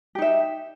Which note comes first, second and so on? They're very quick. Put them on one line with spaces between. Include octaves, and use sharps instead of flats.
G4 D#4 E5